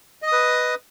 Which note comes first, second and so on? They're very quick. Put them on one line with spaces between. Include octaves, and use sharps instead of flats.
D#5 D#6 B4